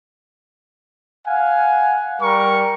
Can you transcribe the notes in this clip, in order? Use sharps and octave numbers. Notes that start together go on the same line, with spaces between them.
F5 F#5 G#5
G3 A#4 C#6